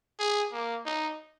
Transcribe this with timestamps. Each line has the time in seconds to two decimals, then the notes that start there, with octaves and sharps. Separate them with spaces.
0.19 G#4
0.52 A#3
0.86 D#4